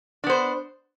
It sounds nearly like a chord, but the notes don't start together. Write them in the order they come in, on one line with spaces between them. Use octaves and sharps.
D4 B3 C5